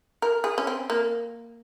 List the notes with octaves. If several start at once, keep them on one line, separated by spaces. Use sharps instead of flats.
A#4
G#4
C#4
C4
A#3